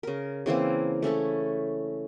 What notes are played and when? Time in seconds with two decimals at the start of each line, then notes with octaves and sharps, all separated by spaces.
0.03 C#3 A#4
0.46 C#3 E3 A#3 C4
1.02 A3 C#4 E4 A4